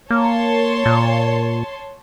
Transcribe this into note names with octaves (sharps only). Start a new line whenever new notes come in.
A#3 C#5 A5 C6
A#2